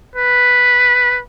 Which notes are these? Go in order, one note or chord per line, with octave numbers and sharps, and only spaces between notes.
B4